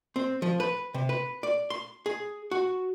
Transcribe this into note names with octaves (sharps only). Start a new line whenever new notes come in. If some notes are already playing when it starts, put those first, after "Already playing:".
C4
F3
B4
C3
B4
D5
C6
G#4
F#4